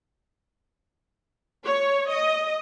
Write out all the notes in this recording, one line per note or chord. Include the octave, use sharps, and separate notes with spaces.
C#5
D#5